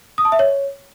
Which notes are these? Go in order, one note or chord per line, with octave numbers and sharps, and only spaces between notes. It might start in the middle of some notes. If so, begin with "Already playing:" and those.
D#6
A5
E5
C#5